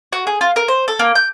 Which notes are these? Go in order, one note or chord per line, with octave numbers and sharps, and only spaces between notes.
F#4
G#4
F4
A#4
C5
A4
A#3
G6